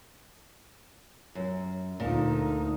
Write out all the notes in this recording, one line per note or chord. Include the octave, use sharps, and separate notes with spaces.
F#2
D2 A#2 D#4 A5